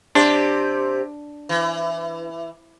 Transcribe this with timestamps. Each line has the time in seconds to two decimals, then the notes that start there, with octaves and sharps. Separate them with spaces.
0.15 C3 D4 G4 C5
1.49 E3